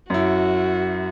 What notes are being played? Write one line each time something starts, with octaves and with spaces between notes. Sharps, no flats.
F#2 E4 F#4